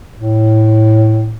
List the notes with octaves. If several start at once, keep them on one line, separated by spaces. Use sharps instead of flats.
A2